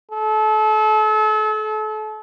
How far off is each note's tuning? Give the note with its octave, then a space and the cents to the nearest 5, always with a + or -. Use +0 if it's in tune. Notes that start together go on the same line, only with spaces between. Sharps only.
A4 -35